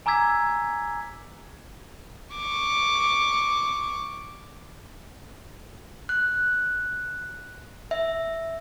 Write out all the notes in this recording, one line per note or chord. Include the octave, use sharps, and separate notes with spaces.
G#5 A#5 D6 E6 G#6 B6
C#6 D6
F#6
E5